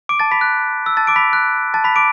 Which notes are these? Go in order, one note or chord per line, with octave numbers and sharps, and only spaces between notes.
D6 D7
A5 A6
B5 B6
F#6
E6
A5 A6
D6 D7
B5 B6
F#6
A5 A6
B5 B6
D6 D7